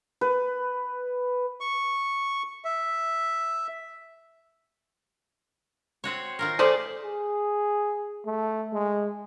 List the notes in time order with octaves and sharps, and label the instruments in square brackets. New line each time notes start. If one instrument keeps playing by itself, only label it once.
[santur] B4
[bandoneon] C#6
E5
[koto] C4 F#4 C#5
D#3 F4 A#4
[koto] A3 [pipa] G#4 C5 D5
[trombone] G#4
A3
G#3